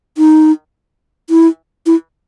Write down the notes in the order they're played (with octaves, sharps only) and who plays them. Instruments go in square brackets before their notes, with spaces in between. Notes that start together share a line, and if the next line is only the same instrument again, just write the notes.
[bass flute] D#4
E4
E4